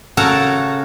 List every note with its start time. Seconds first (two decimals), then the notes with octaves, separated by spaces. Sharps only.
0.17 C#3 F#4 A4 A#4 A5 A#5